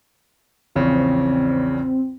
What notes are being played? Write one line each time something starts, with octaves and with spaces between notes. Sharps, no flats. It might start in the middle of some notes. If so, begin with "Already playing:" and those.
A#1 E2 C#3 C4